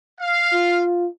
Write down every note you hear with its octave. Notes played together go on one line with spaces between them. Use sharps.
F5
F4